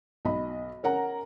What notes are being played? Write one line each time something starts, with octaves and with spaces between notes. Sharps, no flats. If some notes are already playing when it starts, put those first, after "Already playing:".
B1 D#5 B5
C#4 A#4 F#5 A#5